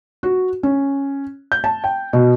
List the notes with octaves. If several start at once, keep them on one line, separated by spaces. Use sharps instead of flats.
F#4
C#4
G6
A5
G5
B2